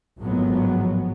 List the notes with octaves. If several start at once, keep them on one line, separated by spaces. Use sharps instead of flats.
G#1 A2 F3 F#3 G#3 B3